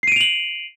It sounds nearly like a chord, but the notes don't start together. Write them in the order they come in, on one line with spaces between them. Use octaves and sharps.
C7 D#7 D7 F7 F#7